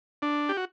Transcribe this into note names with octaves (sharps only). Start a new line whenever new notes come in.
D4
G4
F#4